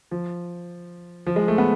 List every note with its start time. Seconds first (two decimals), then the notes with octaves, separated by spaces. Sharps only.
0.11 F3
1.27 F3
1.36 G#3
1.48 A3
1.58 B3